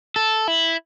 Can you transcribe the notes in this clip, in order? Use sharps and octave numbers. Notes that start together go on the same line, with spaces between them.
A4
E4